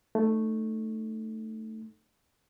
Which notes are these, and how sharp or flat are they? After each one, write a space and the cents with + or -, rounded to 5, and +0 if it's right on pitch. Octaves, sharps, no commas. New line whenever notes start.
A3 +5 D#4 -15